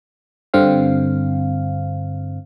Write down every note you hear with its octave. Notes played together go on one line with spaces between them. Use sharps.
G2 D3 C4 F5